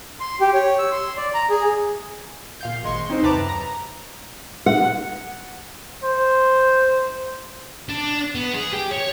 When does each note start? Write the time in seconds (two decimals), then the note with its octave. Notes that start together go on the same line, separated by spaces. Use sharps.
0.20 C6
0.41 G4
0.54 C#5
0.79 E6
0.92 C6
1.17 D5
1.34 A#5
1.50 G#4
2.61 A#2 F5 G6
2.83 G#1 G#3 C6 C#6
3.09 C4 D#4 C5
3.22 D#2 C3 B4 A5 A#5 D6
3.35 F#2
3.49 A#5
4.66 F#5
6.03 C5
7.89 D4
8.35 B3
8.54 G#4
8.73 G4
8.92 C#5